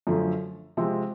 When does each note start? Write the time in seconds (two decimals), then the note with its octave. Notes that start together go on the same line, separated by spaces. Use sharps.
0.07 F#2 D3 F3 A3
0.77 C3 F3 G#3 C4